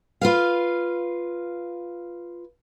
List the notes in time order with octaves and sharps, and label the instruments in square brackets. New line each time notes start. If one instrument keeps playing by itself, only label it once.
[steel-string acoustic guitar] F4 B4 F5